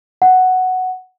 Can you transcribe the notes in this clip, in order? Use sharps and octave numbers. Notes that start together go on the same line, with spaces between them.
F#5